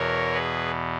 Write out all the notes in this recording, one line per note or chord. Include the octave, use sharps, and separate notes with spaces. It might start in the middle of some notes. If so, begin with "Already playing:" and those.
Already playing: E2 B2 A#4 C#5
G#4 B4